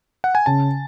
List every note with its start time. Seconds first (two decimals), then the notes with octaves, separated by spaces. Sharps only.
0.24 F#5
0.35 G#5
0.46 C#3 A5